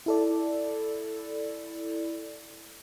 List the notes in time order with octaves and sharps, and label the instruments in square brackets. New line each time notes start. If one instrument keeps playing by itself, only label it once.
[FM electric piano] E4 A4 D5